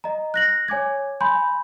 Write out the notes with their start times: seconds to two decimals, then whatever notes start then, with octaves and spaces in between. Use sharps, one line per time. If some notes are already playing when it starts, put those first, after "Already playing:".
0.04 D#5 A#5
0.34 F#6 A#6 F#7
0.68 C#5 G#5 D6 G#6
1.20 G#5 B5 C6 G6